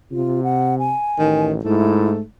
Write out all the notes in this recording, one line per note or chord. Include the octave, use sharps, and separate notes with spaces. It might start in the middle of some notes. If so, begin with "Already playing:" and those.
C3 F4
F#5
G#5
A1 D#3
G#2 A3 E4